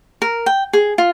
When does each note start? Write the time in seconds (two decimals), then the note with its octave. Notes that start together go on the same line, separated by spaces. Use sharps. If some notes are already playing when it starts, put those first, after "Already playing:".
0.22 A#4
0.46 G5
0.73 G#4
0.98 F4